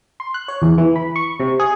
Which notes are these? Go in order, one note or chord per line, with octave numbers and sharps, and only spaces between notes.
C6
F#6
C#5
E2
E3
B5
C#6
C3
G#4